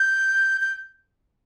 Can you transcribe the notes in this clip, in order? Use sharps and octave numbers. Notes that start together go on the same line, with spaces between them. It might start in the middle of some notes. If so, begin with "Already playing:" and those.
Already playing: G6
G6